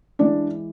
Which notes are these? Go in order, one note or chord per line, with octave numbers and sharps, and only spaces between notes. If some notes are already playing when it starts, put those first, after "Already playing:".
E3 G#3 D4 D5